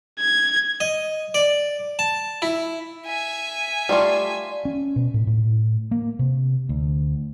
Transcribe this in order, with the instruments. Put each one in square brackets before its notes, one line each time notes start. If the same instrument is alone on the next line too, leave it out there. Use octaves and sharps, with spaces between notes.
[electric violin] G#6
[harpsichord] D#5
D5
A5
E4
[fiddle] E5 G#5
[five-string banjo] G3 A3 F4 [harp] D5 A5 C6
[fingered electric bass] C#4
B2
A2
A2
A#3
C3
D2